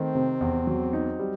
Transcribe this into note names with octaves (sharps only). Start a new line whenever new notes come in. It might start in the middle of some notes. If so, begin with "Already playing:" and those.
Already playing: D#3 A3 C4
C3
E2
F#3
D#4
G3